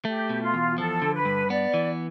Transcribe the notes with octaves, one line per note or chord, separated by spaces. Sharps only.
A3 G4
B2
F4
E2
F3 A4
D3
B4
G2
B3 D5
E3